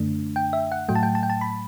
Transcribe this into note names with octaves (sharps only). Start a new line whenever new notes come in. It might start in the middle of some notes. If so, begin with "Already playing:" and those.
Already playing: F#2 D3 A3 D4
G5
E5
F#5
A2 F#3 A3 G5
A5
G5
A5
G5
A5
B5